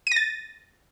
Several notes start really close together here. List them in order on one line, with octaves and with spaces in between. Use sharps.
D#7 A#6 A6